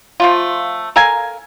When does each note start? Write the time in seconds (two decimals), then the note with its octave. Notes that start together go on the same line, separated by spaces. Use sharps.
0.20 F3 A3 F4
0.96 A4 A#4 F5 G#5